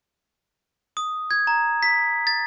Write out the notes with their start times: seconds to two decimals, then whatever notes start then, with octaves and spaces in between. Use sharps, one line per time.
0.97 D#6
1.31 G#6
1.47 A#5
1.83 B6
2.27 A6